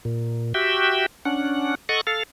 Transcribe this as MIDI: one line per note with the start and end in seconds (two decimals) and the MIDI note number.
0.05 0.53 46
0.54 1.06 66
0.54 1.06 67
0.54 1.06 76
0.54 1.06 79
1.25 1.75 61
1.25 1.75 62
1.25 1.75 78
1.89 2.01 69
1.89 2.01 75
1.89 2.01 78
1.89 2.01 85
2.07 2.23 69
2.07 2.23 77